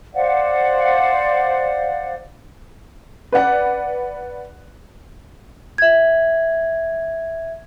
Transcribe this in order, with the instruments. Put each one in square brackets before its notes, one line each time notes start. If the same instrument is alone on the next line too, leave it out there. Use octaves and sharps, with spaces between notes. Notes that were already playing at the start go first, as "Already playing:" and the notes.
[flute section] C5 D5 F5 F#5
[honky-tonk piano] B4 D5 F#5
[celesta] E5 G#6